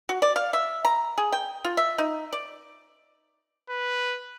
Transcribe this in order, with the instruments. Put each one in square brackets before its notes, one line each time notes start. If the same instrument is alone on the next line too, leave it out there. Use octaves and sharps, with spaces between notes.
[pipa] F#4
D5
F5
E5
A#5
G#4
G5
F4
E5
D#4
D5
[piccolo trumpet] B4